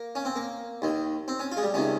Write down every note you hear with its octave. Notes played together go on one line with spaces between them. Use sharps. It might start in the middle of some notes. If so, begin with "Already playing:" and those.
Already playing: A#3
C#4
C4
A#3
D#2 D#3
C4
C#4
F4
G#3
G3
C#2 C3 D#3 C#4